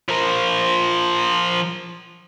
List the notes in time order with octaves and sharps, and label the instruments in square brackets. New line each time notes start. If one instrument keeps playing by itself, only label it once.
[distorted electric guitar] F3 A#4